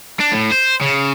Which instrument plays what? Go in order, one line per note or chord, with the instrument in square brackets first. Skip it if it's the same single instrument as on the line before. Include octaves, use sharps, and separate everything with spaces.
[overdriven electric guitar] D4
A2
C5
C#3